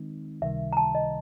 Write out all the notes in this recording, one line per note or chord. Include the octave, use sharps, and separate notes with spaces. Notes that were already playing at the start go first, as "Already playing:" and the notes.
Already playing: D#3 G#3 C4 D#4
C#2 C3 D#3 G3 E5
A#5
A5
D#5